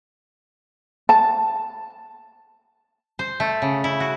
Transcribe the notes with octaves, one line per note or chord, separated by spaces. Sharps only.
A5
C5
A3
C#3
E4
F#4